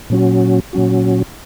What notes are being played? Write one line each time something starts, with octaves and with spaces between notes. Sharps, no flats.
A#2 F#3 C#4 F#4
A#2 F#3 C#4 F#4